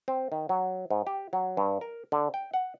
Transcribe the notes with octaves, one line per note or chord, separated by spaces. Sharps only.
C4
D#3
F#3
G#2
G4
F#3
G2
A#4
D3
G5
F#5